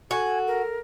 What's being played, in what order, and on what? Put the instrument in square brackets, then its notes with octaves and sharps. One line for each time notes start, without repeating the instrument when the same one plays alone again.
[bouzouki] F#4 [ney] A4 [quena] G#5
[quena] A#4